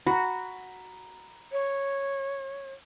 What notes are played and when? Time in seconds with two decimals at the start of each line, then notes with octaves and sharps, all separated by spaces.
0.07 F#4 A#5 B5
1.52 C#5